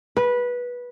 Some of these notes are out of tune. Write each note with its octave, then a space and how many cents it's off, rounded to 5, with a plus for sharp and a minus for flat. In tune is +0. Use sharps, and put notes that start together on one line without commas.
B4 -15